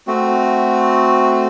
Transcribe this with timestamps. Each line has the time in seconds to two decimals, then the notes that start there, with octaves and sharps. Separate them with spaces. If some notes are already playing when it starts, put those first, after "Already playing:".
0.07 A3 C4 F#4